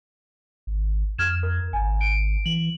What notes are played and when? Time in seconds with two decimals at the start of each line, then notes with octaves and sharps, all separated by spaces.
0.67 G#1
1.18 F2 F6 G#6 E7
1.43 A#4
1.73 G#1 G#5
2.01 D7
2.46 E3 F#7